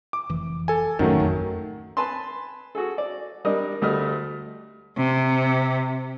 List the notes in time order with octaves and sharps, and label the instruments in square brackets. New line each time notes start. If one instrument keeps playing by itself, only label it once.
[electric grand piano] D6
[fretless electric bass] F1 E3
[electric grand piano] A4 G#5
[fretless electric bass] A1 F#2 C#4 [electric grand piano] D#3 F#3 A3
[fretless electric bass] F2
[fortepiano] B4 G#5 A5 B5 C6
F#4 G#4 A4
D5
G3 D4 A#4 D#5
D2 G3 A3 D#5 F6
[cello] C3